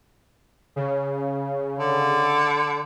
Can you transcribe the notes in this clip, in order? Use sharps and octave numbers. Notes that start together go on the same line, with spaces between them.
C#3
D3